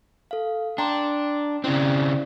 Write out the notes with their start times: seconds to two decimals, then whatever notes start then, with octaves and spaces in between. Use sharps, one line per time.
0.31 A4 F5
0.78 D4 G5 A#5 C6
1.64 C#3 C4 C#4 E4 D5